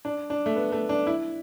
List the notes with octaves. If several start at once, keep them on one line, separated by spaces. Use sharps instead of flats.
D4
D4
A3
B3
A3
D4
E4